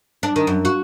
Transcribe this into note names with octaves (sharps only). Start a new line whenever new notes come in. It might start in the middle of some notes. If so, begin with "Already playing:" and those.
D4
D#3
F#2
F#4